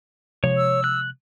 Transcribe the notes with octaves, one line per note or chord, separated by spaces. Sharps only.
C3 F3 G#3 C#5
E6
F#6